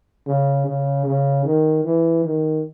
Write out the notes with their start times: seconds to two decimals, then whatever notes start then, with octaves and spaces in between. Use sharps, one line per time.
0.27 C#3
0.66 C#3
1.05 C#3
1.45 D#3
1.84 E3
2.25 D#3